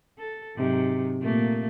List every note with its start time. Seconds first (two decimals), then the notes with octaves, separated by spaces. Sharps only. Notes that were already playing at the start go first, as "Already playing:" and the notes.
0.18 A4
0.57 G#2 C3 F#3
1.22 A#2 A3 A#3